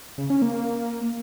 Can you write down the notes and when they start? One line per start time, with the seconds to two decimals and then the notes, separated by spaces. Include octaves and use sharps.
0.18 C#3
0.30 C#4
0.42 A#3